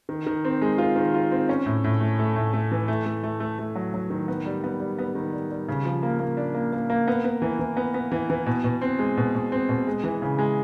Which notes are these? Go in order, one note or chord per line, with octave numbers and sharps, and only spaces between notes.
D#3
D#3
C4
G#3
F4
D#3
F4
C4
C#4
A2
A2
A3
A3
A2
A3
E3
A3
A3
A3
A3
A3
F#3
F#3
D#3
B3
G3
B3
G3
B3
D#3
G3
G3
C#3
F3
A#3
A#3
D4
A#3
A#3
A#3
B3
B3
E3
E3
B3
B3
E3
E3
B2
B2
C4
G#3
B2
B2
C4
B2
G#3
E3
C#3
G#3